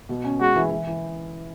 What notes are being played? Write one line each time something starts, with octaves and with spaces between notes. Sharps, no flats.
B2
C#4
G#3 F#4
E3
E3
E3